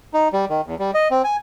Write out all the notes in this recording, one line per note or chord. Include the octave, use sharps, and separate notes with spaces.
D#4
G3
D#3
E2
G3
D#5
C4
G#5